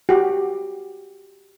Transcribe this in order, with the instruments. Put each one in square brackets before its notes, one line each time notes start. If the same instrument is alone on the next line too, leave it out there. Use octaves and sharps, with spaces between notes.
[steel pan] F#4 G4